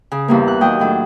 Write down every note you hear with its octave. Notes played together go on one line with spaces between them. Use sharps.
C#3
E2 G2 A#3
F#6
D#2 F#3 D#5 G5
A2 F#3 D4